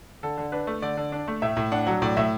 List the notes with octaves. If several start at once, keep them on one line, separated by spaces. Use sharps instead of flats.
D3 A4
D3
D4 B4
A3
D3 D5
D3
D4
A3
A2 E5
A2
D4 F#5
F#3
A2 D5
A2 E5